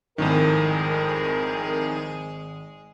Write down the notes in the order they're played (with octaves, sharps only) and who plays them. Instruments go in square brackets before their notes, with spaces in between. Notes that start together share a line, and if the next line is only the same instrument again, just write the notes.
[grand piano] G#1 [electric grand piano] F2 A2 D#3 [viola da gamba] G#3 G#4 [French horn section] A#4